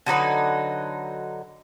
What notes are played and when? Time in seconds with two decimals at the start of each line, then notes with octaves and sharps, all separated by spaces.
0.06 D3 F#3 D#4 B4